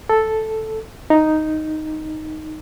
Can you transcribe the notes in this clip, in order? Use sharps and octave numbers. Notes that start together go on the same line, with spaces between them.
A4
D#4